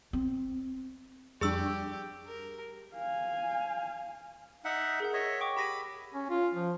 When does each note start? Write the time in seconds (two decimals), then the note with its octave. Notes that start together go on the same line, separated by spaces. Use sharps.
0.13 C4
1.41 F2 G3 D4 G4 G#4 C#6 E6
2.27 A#4
2.95 F5 G#5
4.65 D#4 E5 F#5
5.00 G#4 A#4 F#5
5.14 C#5 D#5 E5
5.41 G5 C#6 D6
5.57 G4 B5 A#6 D#7
6.15 C#4
6.30 F4
6.54 F3